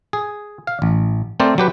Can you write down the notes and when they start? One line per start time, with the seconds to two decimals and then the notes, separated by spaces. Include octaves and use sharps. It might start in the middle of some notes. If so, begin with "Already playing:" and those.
0.13 G#4
0.67 F5
0.82 A1
1.40 A3 C4 A#4 C5 D5
1.58 F#3 G4 B4